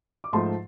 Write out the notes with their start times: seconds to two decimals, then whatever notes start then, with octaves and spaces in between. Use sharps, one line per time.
0.24 D6
0.33 G#2 F3 A3 A5 C6